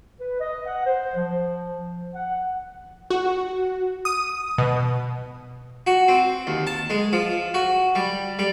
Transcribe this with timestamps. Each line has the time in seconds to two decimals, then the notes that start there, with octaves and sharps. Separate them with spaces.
0.20 B4
0.40 D#5
0.66 F#5
0.86 C5
1.16 F3
2.14 F#5
3.10 F#4
4.05 D#6
4.58 B2
5.87 F#4
6.08 C4
6.47 D#2
6.67 A5
6.90 G#3
7.13 F3
7.54 F#4
7.95 G3
8.39 G3